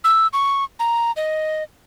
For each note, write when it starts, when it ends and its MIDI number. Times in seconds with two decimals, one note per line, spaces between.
0.04 0.27 88
0.33 0.64 85
0.79 1.12 82
1.16 1.63 75